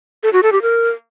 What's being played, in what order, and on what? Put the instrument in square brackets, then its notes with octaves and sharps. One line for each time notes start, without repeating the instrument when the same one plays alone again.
[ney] A4
F#4
A4
G4
A#4